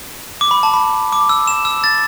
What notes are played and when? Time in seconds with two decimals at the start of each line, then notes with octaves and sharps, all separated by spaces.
0.41 D6
0.51 B5
0.63 A5
0.74 B5
1.12 D6
1.29 E6
1.48 E7
1.65 E6
1.84 A6